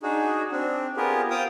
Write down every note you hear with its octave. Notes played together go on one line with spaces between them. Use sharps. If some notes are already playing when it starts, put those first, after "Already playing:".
D4 D#4 F#4 G#4
C4 D4
B3 F4 G4 G#4 A#4
F4 C5 F5 G5 D#6